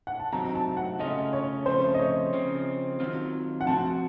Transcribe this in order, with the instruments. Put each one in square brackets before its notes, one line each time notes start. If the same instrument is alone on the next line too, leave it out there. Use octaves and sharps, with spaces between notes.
[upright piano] F#5
A5
[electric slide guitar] C3 F#3 C4 D#4 [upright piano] A#5
[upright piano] A5
F#5
[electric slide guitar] C#3 A3 C#4 F4 [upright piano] D#5
[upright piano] C#5
[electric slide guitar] F2 C#3 A3 [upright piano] C5
[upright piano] D#5
C#5
[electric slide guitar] C#3 F3 C4
D#3 F#3 C4 F4
[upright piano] F#5
[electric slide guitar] F3 C4 F#4 [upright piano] A5